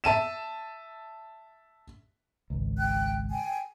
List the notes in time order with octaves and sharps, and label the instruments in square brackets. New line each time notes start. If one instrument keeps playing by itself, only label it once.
[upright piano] E5 A5 D#7 E7
[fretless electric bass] G#1 C#2
[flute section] G5 F#6
G5 G#5